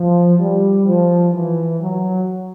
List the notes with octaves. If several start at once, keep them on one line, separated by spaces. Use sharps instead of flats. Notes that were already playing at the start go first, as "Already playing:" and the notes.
Already playing: F3
G3
F3
E3
F#3